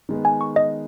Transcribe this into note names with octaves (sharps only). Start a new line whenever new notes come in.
D#3 G#3 B3
G#5
C#6
D#5